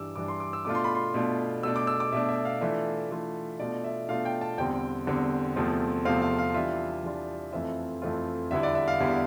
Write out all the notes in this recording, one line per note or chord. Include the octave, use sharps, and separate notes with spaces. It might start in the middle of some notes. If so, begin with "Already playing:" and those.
Already playing: G2 E3 G3 D4 D6 E6
G2 E3 G3 D4 D6
C6
D6
E6
B2 A3 D4 F4 D6
C6
B5
C6
B2 A3 D4 F4
B2 A3 D4 E6
D6
E6
D6
B2 A3 D4 E5
E5
F5
E3 A3 D4 F4 E5
E3 A3 D4 F4
B2 A3 D4 F4 D5
E5
B2 A3 D4 F4 F5
G5
A5
E2 D3 G3 C4 G5
E2 D3 G3 C4
E2 C3 F3 A3 C4
E2 C3 F3 A3 C4 F5
F5
F5
E3 G3 D4 F4 E5
E3 G3 D4 F4
F2 E3 A3 C4 F4 E5
F2 E3 A3 C4 F4
E2 D3 G3 B3 E4 E5
D5
E5
F5
E2 D3 G3 B3 E4